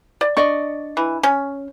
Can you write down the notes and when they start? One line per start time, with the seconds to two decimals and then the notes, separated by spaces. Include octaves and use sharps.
0.21 D5
0.37 D4 D5 D#5 C#6
0.97 E3
1.23 C#4